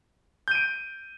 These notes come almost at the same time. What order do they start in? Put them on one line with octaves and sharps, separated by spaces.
G6 D#7 D7